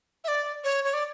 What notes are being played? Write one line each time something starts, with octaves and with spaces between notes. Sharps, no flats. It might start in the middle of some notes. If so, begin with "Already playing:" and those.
E5
D5
C#5
C#5
D5